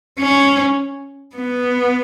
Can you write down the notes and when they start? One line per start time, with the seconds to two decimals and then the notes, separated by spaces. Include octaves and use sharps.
0.19 C#4
1.36 B3